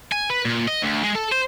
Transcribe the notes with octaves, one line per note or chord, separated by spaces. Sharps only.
G#5
B4
A#2
D#5
D2
G#3
A4
C5